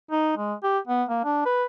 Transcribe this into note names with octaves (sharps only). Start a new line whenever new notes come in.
D#4
G#3
G4
B3
A#3
D4
B4